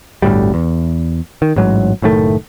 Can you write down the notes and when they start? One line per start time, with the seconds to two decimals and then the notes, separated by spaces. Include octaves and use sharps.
0.22 G1 D2 A2 G3
0.54 E2
1.42 D#3
1.56 A1 G#2 F#3
2.02 F#1 A2 D#3 A3